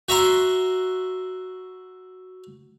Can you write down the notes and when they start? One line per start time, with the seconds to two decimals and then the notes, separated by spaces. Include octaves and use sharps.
0.08 F#4 E5 A#5 C6